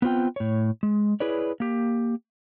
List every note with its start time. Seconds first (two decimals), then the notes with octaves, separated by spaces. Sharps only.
0.02 B3 C4 F4 G5
0.36 A2 C#5
0.83 G#3
1.20 E4 G#4 B4 C#5 D5
1.60 A#3 G4